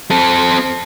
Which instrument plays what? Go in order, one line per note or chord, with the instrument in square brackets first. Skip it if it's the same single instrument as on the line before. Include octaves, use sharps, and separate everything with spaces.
[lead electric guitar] C4 A4